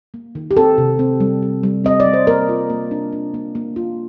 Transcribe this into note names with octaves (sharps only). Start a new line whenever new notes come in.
A#3
D#3
G4
C4 A4
C3
C4
G3
G3
G3
C4 D#5
D5
G3
C5
A#3 A#4
F4
A#3
D4
D4
A#3
A#3
F4